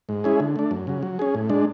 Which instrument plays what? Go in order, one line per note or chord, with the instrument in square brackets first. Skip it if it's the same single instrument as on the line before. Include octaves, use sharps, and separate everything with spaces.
[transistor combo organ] G#2
G#3 C#4 E4 G#4
D3
A3 D4
F#2
C#3 F#3
F#3
C#4 G#4
A2
G#3 D4